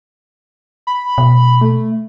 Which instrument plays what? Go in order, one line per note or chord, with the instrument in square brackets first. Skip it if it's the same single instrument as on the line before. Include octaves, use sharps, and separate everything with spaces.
[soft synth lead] B5
[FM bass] B2
[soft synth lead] A3